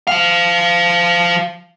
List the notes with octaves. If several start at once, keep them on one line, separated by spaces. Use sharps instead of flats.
F3 F5